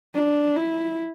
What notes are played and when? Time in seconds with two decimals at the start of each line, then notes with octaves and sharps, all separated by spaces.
0.15 D4
0.57 E4